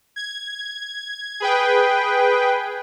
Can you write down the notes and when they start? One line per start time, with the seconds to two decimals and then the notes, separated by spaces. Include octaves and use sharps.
0.16 G#6
1.40 G#4 B4 G5